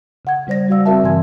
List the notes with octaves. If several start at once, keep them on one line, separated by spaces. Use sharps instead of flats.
C#3 F#5 G#6
C#3 G3 C5 D5 A#6
G3 F#4 D5 F5 E6
C4 F#4 A#4 D5 E5 A5
G2 C#3 E3 G#5 C6 G#6